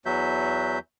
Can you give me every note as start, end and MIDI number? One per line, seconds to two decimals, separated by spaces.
0.06 0.79 40
0.06 0.79 52
0.06 0.79 54
0.06 0.79 66
0.06 0.79 76
0.06 0.79 91